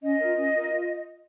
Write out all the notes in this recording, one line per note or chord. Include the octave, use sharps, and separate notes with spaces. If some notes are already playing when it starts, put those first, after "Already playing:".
C#4 D#5
F4 A#4
C#4
F4 A#4
F4